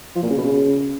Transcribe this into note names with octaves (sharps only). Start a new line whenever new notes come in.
F3
A#2
C#3
B2
C#3